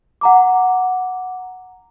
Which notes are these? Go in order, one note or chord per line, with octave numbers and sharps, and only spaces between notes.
F#5 A#5 D6